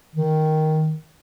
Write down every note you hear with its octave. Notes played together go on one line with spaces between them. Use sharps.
D#3